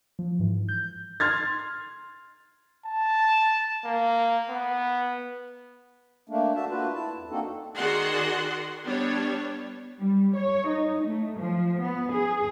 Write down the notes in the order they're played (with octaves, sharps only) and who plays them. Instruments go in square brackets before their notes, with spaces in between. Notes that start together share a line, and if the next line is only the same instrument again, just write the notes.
[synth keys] F3
G#2 E3
G6
[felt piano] C6 F6 G#6 A6
[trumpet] A5
A#3
B3
[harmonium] A3 A#3 D4
A3 F#4 E5 A5
A#3 D4 F4 F#4 B4
E4 A5
F2
A#3 C4 D4 D#4 F#4 A4
[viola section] D#3 F#4 G#4 D5 F#5 C6
G3 B3 D4 C#5
[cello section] G3
C#5
D#4
A3
F3
B3
G#4